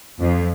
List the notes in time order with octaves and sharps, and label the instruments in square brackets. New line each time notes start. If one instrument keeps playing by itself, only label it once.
[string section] F2